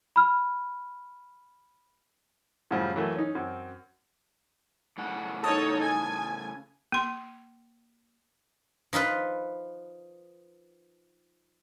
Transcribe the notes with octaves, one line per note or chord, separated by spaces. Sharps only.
B5 F6
F#2 A2 C#3 F3 G3
E3 F#3 A3 A#3
C#4 D#4
F#2 C4
A2 C#3 F#5
D#4 A4 C#5 A5 D#6
G#5
A#3 C6
F3 D#4 F4 B4